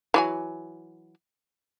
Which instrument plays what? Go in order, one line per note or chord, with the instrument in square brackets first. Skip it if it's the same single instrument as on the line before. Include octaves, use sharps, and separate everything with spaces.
[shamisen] E3 F#3 G#5